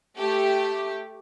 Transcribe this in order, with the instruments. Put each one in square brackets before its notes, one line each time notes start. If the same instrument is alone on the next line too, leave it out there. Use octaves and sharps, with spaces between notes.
[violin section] A3 G4